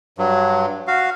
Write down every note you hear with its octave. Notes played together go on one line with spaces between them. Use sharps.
G2 F#3
F#4 F5